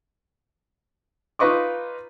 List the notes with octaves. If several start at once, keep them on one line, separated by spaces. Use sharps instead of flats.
D#4 F4 B4 D#5 C#6 D6